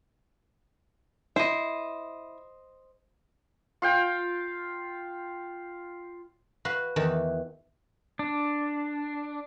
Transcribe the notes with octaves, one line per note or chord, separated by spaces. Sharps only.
E4 C5 D#5
F4 F5 G5
F#4 B4 F5
E2 D#3 E3
D4